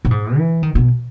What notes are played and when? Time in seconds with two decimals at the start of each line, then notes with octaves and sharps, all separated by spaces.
0.05 A#2
0.11 G#2
0.37 E3
0.63 D#3
0.75 B2